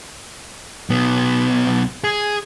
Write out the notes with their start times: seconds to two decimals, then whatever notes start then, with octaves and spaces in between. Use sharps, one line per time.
0.90 B1 B3
2.04 G#4